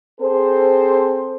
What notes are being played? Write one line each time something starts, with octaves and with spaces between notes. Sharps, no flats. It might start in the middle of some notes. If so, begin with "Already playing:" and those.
C4 G#4 A4 C5